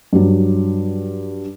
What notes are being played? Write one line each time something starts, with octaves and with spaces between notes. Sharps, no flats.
G2 F#3